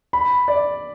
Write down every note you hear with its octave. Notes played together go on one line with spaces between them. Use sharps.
B5
D5